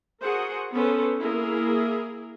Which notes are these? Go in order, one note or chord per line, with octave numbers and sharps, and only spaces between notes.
F#4 G#4 A#4 C5 F#5
B3 C#4 A4 B4 C5
A#3 E4 G#4 A#4